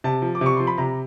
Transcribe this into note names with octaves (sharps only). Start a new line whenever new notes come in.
C3 A5
F3
D6
C3 C#6
F3 C6
B5
C3 A#5